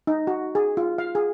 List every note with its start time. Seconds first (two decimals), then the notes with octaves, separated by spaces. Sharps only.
0.07 D#4
0.27 F#4
0.55 G#4
0.77 F4
0.98 F5
1.15 G#4